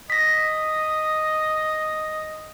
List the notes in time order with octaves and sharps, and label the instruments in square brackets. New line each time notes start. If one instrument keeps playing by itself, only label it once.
[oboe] D#5 [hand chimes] A#6 B6